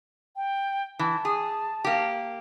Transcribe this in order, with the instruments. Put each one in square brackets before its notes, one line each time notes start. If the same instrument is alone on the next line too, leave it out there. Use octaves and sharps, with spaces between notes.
[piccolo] G5
[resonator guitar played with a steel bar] E3 [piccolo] A5
[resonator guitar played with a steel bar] G#4
A#3 G4